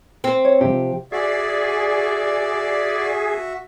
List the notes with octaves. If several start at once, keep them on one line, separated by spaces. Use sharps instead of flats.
C4
C#5
C3 F3 G4
F#4 G#4 D5 E5